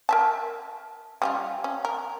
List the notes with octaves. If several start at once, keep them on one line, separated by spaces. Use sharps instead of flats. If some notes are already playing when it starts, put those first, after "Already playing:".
A#4 E5 A5
G3 C#4 F4
C#4
A#4